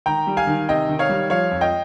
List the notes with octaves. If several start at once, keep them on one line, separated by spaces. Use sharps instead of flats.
D#3 G5 A#5
G3
F5 G#5
D#3
C3 D#5 G5
D#3
C#5 F5
G3
F3 C#5 F5
F2
D#5 G5